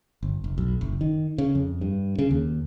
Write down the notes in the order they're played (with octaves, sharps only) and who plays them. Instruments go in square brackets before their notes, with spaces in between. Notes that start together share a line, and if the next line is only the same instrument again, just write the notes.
[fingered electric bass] G1
F1
B1
F#1
D#3
C#3
F2
G2
C#3
D#2